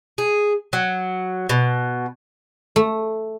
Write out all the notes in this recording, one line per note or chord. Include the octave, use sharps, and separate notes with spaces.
G#4
F#3
B2
A3